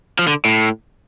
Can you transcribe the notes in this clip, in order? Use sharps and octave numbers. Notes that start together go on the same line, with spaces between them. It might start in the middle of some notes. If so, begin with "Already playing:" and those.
F3
D3
A2